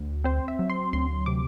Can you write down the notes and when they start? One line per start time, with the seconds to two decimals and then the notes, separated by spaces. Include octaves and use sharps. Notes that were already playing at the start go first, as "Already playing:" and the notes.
Already playing: D2
0.24 C4 C5
0.48 E5
0.59 F#3
0.70 C6
0.93 D2 C6
1.26 C3 D6